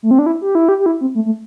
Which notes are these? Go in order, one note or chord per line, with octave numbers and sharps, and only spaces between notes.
A3
C4
D4
E4
G4
E4
G4
G4
E4
C4
A3
A3